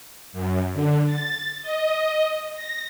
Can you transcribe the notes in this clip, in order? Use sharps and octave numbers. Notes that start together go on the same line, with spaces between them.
F#2
D3
A6
D#5
A#6